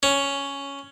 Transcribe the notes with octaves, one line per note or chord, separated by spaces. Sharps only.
C#4